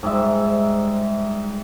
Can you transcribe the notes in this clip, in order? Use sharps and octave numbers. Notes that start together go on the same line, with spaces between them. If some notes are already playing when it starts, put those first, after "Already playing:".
G#2 G3 E5